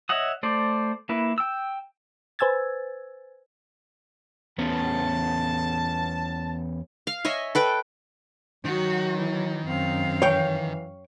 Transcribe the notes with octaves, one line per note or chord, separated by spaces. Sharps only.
C#5 D#5 E5 F#5 D#6
A3 C5 D5
A#3 E4 B4
G5 E6
B4 C5 G#5 E6 G#6 A6
E2 B3 C#4 A5
F5
C#5 D#5 E5 G#5
A4 B4 G5
D#3 F#3 F#4
E3
F#2 C4 F5
E3 C#5 G5